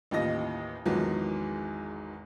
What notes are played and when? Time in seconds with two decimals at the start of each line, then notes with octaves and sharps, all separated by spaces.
0.11 A1 D#2 F4 G4 D#5 A#6
0.86 G#1 E2 D#3 F3 F#3 G#3